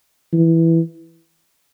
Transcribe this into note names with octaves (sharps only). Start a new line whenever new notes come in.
E3